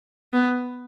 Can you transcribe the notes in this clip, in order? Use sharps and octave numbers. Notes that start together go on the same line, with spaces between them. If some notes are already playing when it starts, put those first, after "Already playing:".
B3